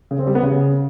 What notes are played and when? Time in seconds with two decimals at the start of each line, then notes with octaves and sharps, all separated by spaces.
0.11 C#3
0.19 C4
0.27 G3
0.35 B3
0.43 C#3